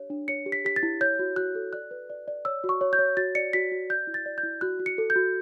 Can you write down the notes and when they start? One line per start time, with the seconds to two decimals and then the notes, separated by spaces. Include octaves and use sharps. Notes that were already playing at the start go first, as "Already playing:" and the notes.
Already playing: D4 G4 C#5
0.10 D4
0.28 C#5 C#7
0.46 G4
0.52 B6
0.65 G4 B6
0.76 A6
0.83 E4
1.01 C#5 G6
1.19 F#4
1.36 F#4 F#6
1.55 A4
1.73 D5 F#6
1.91 B4
2.10 D5
2.28 D5
2.45 C#5 E6
2.64 F#4
2.69 C#6
2.81 C#5
2.93 G6
2.99 C#5
3.17 F#4 A6
3.35 D5 C#7
3.53 F#4 B6
3.72 F#4
3.89 D5 G6
4.07 E4
4.14 A6
4.26 D5
4.38 G6
4.43 E4
4.61 F#4 F#6
4.80 F#4
4.86 C#7
4.98 A4
5.10 G6
5.16 F#4